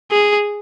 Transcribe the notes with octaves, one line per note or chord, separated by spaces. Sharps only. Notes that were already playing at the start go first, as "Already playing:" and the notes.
G#4